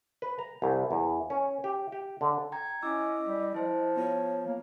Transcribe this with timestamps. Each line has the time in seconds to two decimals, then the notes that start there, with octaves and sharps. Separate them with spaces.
0.22 B4
0.39 A#5
0.62 C2
0.91 E2
1.30 C#4
1.64 G4
1.92 G4
2.21 D3
2.52 G5 A#5 G#6
2.83 C#4 E4 D#5 D6 E6
3.25 G3
3.54 F3 E4 C5
3.96 B3 F4 C#5
4.46 A#3